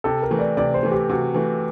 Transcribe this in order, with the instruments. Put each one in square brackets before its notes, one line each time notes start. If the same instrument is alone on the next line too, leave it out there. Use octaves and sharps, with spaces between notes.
[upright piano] C3 [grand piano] A4
[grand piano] A#4
[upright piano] E3 A3
[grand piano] D5
[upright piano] C3 [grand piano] D5
[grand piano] C5
[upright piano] E3 A3
[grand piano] G4
[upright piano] C3 [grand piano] F#4
[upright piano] E3 A3